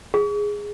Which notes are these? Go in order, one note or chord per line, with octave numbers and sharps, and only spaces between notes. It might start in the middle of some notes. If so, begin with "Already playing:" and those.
G#4